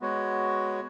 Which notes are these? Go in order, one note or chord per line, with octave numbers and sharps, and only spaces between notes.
G#3 B3 F#4 C#5